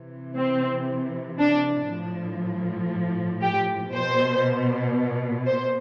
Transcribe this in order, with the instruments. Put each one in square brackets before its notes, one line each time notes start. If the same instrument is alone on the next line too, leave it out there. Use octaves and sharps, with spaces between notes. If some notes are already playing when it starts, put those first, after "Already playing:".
Already playing: [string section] C3 E3
C4
D4
A2 F3
G4
B2 C5
C5